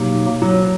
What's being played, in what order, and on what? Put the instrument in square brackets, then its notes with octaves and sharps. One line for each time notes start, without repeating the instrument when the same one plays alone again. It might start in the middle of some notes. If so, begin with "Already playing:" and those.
Already playing: [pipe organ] B2 F#3 A#3 D#4 G4
[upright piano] F#3